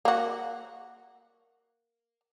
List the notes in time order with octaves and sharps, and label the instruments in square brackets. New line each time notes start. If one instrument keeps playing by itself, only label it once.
[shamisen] A#3 F#4